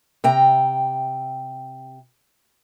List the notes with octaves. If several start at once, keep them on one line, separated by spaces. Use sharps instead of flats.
C3 G5 A#5